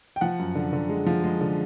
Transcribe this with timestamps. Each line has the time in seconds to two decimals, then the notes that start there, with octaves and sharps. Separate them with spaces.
0.16 G5
0.21 F3 F#5
0.39 F#2
0.55 D3
0.73 D3
0.89 G#3
1.06 F3
1.24 G#3
1.41 D3